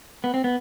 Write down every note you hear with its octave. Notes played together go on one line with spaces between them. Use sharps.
B3
C4
B3